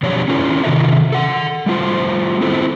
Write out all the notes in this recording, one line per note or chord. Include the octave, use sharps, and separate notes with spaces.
B2 F3 F#3 D4 G4 C#5
C#4 E4 F4 A#4 D5
C3 D#3 F#4 A4 D#5 E5
A4 F#5
G3 A3 F4 C5
C4 E4 A4 C5